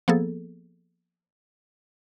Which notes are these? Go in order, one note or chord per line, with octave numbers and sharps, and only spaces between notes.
F3 A#3 B3 G#4 A4